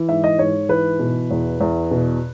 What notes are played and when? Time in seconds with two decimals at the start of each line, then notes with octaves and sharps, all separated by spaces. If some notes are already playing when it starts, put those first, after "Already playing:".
Already playing: E3
0.09 G#2 E5
0.24 D#5
0.39 G#2 C#5
0.69 E3 B4
0.99 B2
1.31 E2
1.61 E2
1.91 B2